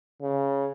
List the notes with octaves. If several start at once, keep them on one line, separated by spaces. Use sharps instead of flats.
C#3